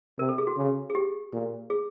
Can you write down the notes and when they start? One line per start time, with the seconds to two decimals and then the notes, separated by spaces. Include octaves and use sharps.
0.19 C3 A#4
0.29 A4
0.38 G#4
0.47 F#4
0.57 C#3
0.90 G#4
0.95 G4
1.33 A#2
1.70 G#4